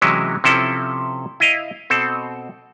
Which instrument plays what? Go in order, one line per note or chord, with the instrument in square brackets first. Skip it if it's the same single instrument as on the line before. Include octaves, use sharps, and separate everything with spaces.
[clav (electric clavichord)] C3 E3 F#3 G#3 C#4 E4
C3 F3 C4 C#4 E4 A4
E4 D#5 F5
B2 C4 A4